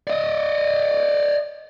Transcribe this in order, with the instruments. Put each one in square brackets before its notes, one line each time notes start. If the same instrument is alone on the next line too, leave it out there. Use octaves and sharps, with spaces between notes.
[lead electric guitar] D5 D#5